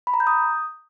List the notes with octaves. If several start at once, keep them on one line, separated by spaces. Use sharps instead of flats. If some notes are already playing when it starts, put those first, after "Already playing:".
B5
A#5
G6
D#6